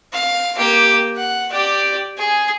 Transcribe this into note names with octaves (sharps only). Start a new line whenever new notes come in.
F5
A#3 G4
F#5
G4 D5
G#4